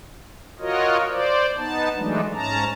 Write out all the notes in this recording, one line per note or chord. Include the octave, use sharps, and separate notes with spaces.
F4 F#4 A#4 C#5 D#5
C5 D5
B3 D#4 A5
E3 F#3 G#3 A3 D4 D#4
G#2 C#4 A5 A#5